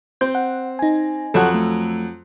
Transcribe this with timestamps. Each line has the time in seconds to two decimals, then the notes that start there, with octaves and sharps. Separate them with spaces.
0.21 C4 G6
0.35 F#5
0.79 D#4 G#5
1.34 F2 F#3 A4 C#5 F#5 F#6
1.54 A3